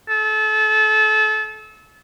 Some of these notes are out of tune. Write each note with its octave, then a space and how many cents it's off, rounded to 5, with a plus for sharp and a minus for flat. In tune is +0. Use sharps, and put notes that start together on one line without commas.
A4 -30